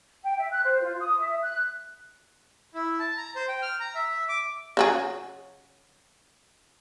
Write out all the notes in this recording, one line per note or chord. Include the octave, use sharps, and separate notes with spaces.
G5
E5
F#6
C5
F4
D#6
E5
F#6
E4
A5
A#5
C5
G5
F6
A#5
E5
D6
C#3 F#3 G#4